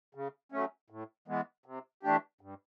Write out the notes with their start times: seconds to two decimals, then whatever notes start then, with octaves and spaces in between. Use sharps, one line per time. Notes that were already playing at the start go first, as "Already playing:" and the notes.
0.15 C#3
0.52 F#3 A3 C#4
0.90 A2
1.28 E3 G#3 B3
1.66 C3
2.03 E3 A3 D4 G4
2.41 G2